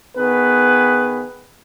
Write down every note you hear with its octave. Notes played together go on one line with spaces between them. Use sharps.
D#3 B3 G#4 B4